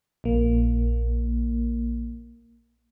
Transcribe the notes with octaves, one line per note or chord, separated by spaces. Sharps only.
A#1 A#3